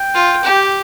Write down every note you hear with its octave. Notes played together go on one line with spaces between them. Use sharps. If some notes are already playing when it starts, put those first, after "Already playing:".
Already playing: G5
F4
G4